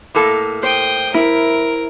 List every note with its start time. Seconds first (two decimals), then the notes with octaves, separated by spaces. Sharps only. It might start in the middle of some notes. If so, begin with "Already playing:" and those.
0.15 A2 A#3 A4
0.63 C5 G5 D#6
1.14 E4 A#4